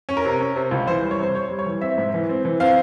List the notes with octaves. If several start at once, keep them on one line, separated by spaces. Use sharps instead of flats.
C#4
A#4
C3
C#4
C3
C#2
E3 C5
G3
C#5
C3 C5
C3 C#5
G3
C#5
E3
C4 E5
G#2
E3
C4
E3
C4 F5